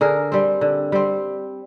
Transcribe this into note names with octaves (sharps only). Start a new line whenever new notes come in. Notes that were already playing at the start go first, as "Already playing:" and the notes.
D3 G#4 A#4
G3 C4
D3
G3 C4